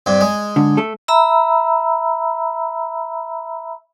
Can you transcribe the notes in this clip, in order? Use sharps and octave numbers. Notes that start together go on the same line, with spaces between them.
G2 C3
G#3
G#2 D3
A3 A4
E5 A#5 B5 E6